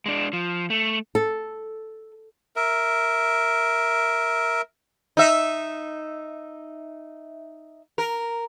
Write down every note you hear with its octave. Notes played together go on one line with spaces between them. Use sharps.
G#3 D4
F3
A3
A4
A#4 E5
D#4 E5
A#4